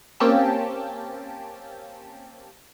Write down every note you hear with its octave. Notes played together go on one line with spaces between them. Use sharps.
A#3 C4 C#4 G4 G5 A5